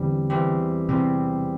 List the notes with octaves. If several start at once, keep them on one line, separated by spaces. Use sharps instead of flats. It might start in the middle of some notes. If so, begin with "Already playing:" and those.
Already playing: E2 D3 E3 G3 C4 G4
E2 E3 G3 C4 G4
E2 C3 E3 G3 C4 G4